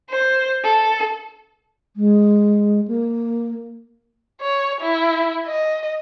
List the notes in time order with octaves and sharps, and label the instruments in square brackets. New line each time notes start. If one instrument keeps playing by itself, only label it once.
[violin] C5
A4
[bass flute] G#3
A#3
[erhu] C#5
E4
D#5